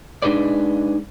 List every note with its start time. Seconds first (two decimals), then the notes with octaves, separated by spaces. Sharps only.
0.22 G#3 D4 D#4 G#4 B4 D5